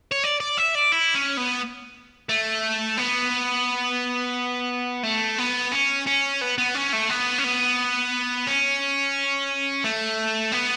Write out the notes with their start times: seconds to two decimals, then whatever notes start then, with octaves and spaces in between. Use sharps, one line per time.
0.11 C#5
0.23 D5
0.40 D5
0.57 E5
0.75 D5
0.92 E4
1.15 C#4
1.37 B3
2.29 A3
2.98 B3
5.03 A3
5.38 B3
5.72 C#4
6.07 C#4
6.41 B3
6.58 B3
6.75 C#4
6.93 A3
7.10 B3
7.38 C#4
7.44 B3
8.47 C#4
9.84 A3
10.52 B3